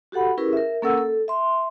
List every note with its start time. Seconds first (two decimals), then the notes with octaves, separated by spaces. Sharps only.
0.12 F#4 G4 A4 F#5 B5
0.37 C#4 E4 G4 G#4 A#4 B4
0.53 A#4 E5
0.82 A#3 C#4 A4 A#4 F#5 E6
0.98 A4
1.28 E5 C6